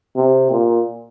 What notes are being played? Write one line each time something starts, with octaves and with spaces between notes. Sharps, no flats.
C3
A#2